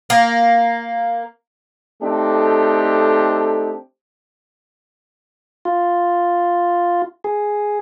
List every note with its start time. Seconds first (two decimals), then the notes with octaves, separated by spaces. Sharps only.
0.10 A#3
2.02 A3 C4 D4 D#4 G4 A4
5.65 F4
7.24 G#4